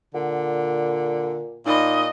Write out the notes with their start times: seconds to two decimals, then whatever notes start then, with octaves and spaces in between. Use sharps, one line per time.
0.14 A#2 D3 F#5
1.66 A#2 D#4 D#5 B5